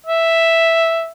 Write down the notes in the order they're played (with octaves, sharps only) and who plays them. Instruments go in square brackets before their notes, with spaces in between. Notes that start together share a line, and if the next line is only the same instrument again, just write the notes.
[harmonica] E5